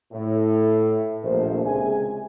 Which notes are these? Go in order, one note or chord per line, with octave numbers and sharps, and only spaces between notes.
A2
A#1 D#2 A3 A#4 C5
C#2 C3 G#4 G#5